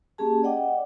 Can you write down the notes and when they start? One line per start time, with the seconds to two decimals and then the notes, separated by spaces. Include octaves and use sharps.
0.18 A#3 C#4 G4 G#4 A5
0.43 D5 D#5 F#5 G5 D6